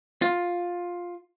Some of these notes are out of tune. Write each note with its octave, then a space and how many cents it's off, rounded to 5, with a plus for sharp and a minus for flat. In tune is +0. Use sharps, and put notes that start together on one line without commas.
F4 +10